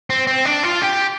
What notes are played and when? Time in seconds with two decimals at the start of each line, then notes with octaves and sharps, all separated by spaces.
0.10 C4
0.27 C4
0.46 D4
0.64 F4
0.82 G4